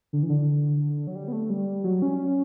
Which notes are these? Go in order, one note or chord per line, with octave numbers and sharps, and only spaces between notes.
D3
E3
D3
F#3
G3
B3
A3
G3
F#3
C#4